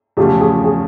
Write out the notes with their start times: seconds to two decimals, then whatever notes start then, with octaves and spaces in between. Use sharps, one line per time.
0.17 E2 C#3 F3 A3 C#4 G4
0.41 G#4
0.64 G#4